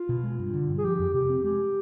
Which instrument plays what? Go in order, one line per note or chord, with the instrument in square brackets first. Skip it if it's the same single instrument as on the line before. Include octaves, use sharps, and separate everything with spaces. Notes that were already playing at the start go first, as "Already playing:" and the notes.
Already playing: [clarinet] F4
[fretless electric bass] B2
G#3
G2
D3
G2
[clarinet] G#4
[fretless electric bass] F3 [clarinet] G4
[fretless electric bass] F2
[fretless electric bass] C3 [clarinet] G4
[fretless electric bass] C4
[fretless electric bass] G#3 [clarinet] G4